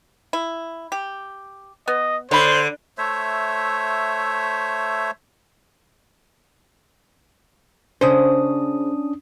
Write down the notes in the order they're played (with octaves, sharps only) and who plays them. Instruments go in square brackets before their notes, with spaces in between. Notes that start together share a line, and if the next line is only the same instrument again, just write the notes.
[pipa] E4
G4
[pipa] B3 [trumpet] D#5
[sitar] D3 [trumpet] C5 [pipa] C#5 B5
[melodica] A3 C5 C#5 E5
[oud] C#3 C5 [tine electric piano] C#4 D4 D#6